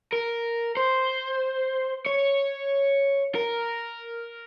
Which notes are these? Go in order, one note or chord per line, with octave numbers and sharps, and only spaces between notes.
A#4
C5
C#5
A#4